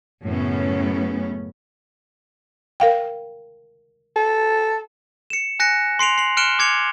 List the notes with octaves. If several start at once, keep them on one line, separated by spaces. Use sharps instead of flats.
F#2 A2 C#3 B3 C#4
A#4 F5 G5
A4
C#7 E7
G#5 F#6 A#6 C#7
C6 C7 D7 F7
C7 F#7
F6 F#6 C#7 D7 E7 G7
D6 G#6 C#7 F7